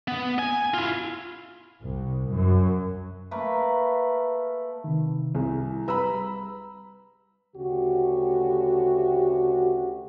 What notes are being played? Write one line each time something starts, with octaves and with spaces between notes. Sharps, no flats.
B3
G#5
E4 F4
C2
F#2
A3 A#3 A#4 B4
C3 D#3
C2 E4 G#4
G3 B4 A#5 B5 E6
D2 C#3 F#4 G4